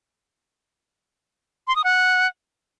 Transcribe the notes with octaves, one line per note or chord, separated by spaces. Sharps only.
C6
D#6
F#5